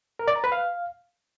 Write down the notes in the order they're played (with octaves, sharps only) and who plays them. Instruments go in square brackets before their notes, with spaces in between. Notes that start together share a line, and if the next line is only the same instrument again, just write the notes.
[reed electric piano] A#4
D5
A#5
B4
F5